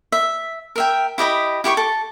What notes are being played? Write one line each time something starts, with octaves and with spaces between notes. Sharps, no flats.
E5
A#4 E5 G5
E4 G4 D#5 B5
E4 G4 F5 C#6
A4